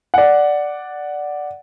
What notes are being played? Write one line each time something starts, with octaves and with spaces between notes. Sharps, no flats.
D5 F#5